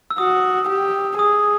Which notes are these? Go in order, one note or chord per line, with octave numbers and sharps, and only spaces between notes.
E6
F#4 D#6
G4
G#4 D#6